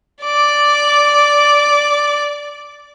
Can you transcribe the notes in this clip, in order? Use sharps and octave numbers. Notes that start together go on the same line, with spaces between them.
D5 D6